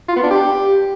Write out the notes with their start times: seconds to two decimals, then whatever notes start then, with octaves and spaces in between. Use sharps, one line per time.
0.09 F4
0.16 B3
0.23 D4
0.31 G4